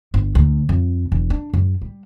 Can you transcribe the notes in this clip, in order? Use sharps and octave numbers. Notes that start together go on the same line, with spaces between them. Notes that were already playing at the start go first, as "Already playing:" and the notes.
G1
D2
F2
E1
D4
F#2
G3